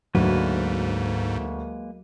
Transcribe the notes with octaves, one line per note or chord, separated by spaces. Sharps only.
D2 G#2 F#3 G#3 A#3 B4